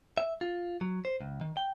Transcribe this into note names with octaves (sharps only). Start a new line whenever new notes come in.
E5
F4
F#3
C5
C#2
D#3
G5